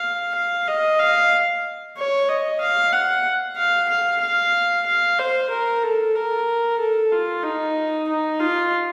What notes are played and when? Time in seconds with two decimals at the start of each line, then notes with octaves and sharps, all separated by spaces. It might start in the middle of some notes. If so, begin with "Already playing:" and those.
Already playing: F5
0.35 F5
0.68 D#5
0.99 F5
1.97 C#5
2.29 D#5
2.61 F5
2.93 F#5
3.57 F5
3.89 F5
4.21 F5
4.87 F5
5.19 C5
5.50 A#4
5.83 A4
6.15 A#4
6.79 A4
7.12 F4
7.44 D#4
8.09 D#4
8.40 F4